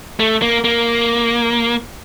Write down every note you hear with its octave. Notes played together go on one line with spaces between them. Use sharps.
A3
A#3
A#3